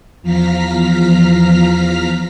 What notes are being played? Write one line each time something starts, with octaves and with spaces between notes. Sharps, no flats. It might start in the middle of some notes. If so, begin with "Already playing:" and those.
E2 F3 F5 A#5 F6 B6